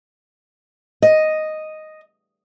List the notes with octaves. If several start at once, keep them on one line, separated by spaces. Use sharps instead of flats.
D#5